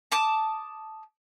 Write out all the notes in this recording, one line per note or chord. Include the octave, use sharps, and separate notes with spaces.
A5 D6 D#6